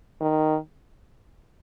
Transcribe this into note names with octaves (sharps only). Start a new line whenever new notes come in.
D#3